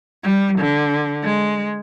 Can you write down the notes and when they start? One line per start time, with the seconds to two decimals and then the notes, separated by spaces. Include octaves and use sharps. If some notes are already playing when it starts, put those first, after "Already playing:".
0.24 G3
0.60 D3
1.24 G#3